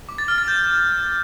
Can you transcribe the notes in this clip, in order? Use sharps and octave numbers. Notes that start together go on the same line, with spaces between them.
D6
A6
F6
A6
G6